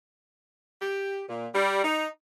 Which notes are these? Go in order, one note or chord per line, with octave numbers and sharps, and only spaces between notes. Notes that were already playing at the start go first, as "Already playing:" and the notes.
G4
A#2
G3
D#4